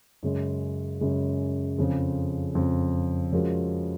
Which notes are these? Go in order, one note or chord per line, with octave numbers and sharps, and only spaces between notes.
F#2 C#3 G#3
F#2 C#3 G#3
F2 C#3 F3
F2 C#3 F3
F3 G#3 C#4 F#4 A#4